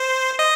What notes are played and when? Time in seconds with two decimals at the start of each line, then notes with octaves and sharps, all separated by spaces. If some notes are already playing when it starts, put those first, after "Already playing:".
Already playing: C5
0.39 D#5